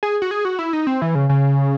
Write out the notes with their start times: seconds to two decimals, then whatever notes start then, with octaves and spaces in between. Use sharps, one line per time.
0.03 G#4
0.22 F#4
0.31 G#4
0.45 F#4
0.59 E4
0.73 D#4
0.87 C4
1.02 E3
1.15 C#3
1.29 C#3